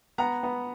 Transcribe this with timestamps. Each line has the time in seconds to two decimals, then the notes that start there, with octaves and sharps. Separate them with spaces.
0.18 B3 F#5 A#5
0.43 B3